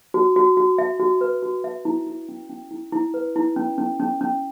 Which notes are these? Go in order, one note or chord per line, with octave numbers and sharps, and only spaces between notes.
F#4
F#4
F#4
E5
F#4
B4
F#4
E5
E4
E4
C#4
C#4
E4
E4
B4
E4
C#4
C#4
C#4
C#4